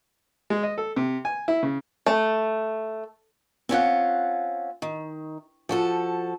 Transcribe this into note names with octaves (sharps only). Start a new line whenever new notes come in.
G#3
D#5
A4
C3
G#5
E4
C#3
A3
C4 C#4 F4 F#5
D#3
F3 F#4 A4